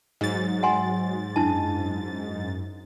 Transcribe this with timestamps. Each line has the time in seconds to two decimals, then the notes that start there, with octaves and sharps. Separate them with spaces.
0.21 G#2 F#3 A6
0.63 F#5 G#5 C6
1.36 F#2 D4 E4 A5